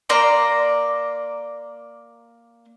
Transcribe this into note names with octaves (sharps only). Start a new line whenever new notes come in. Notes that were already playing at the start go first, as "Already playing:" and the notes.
A#3 D5 A#5 C6